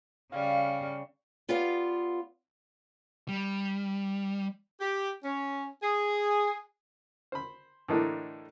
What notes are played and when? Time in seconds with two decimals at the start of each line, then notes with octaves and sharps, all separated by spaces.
0.32 C#3 G3 F5
1.49 B3 F4 G4 B4 D5 F5
3.28 G3
4.80 G4
5.24 C#4
5.83 G#4
7.32 C5 B5
7.88 A2 D3 E3 A#3 D4 D#4